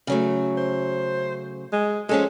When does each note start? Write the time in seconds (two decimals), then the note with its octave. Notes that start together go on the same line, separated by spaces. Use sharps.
0.07 C#3 F#3 A3
0.57 C5
1.72 G#3
2.09 F3 G#3 C#4 A4